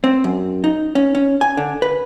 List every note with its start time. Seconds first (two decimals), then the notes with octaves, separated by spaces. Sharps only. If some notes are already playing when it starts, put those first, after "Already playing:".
0.04 C4
0.24 F#2
0.64 D#4
0.95 C#4
1.15 C#4
1.41 G#5
1.57 D3
1.82 B4